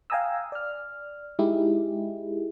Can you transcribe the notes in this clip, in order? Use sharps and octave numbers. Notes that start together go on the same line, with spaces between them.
F5 G5 G#5 A#5 D#6 E6
D5 F6
G#3 D#4 E4 G4 G#4